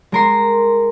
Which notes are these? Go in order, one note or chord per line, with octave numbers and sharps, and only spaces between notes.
G#3 A#4 C6